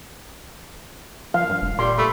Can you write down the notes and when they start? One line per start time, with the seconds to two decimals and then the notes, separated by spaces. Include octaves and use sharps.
1.34 F3 F5
1.50 G2
1.62 F1
1.79 A#2 G3 C6
1.98 A3 B5